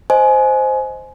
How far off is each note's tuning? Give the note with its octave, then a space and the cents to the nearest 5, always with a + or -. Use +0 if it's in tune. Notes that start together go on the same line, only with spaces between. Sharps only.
C5 +0 D#5 +0 G#5 +25